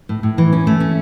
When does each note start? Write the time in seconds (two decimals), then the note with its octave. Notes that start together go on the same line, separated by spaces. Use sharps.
0.09 A2
0.23 A2
0.38 E3
0.52 C#4
0.67 A3
0.80 C#4